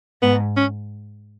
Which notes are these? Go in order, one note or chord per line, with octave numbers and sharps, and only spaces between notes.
G#2 B3
C#4